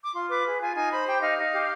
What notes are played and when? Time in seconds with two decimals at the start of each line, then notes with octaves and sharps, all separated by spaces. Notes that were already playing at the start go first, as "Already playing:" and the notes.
0.04 D6
0.13 F4 C6
0.29 B4 D6
0.44 G#4
0.60 F4 G#5
0.75 D#4 G#5
0.90 C5 B5
1.06 G4 G5
1.22 D#4 F5
1.38 D#4
1.53 G4